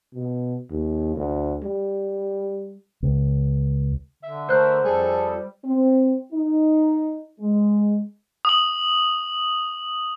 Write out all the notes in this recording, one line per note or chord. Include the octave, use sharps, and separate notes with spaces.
B2
D#2
D2
G3
C#2
D3 E5
A3 A#4 C5 F#6
F2 G3 G#4 A4
C4
D#4
G#3
D#6 F#7